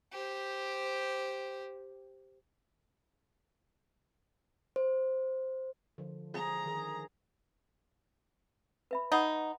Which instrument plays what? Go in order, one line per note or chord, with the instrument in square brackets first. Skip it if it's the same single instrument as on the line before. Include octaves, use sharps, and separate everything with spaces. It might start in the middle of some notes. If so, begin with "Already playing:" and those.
[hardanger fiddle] G4 C5
[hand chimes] C5
[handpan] D3 F3
[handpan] G#4 [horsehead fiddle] A#5
[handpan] D#3 G#4
[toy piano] B4 E5 B5
[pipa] D#4 [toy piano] D#5 F#5 B5